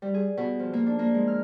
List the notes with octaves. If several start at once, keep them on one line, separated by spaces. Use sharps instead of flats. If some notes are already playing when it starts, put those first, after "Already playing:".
G3
G#4
B2
F3
A#3
D4
A#3
G#3
F6